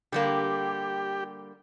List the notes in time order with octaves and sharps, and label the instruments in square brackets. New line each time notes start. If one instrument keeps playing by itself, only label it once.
[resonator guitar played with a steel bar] D3 G3 A#3 [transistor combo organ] G4